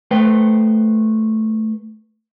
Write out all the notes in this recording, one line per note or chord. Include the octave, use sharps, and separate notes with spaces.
A3 B4 C5 G5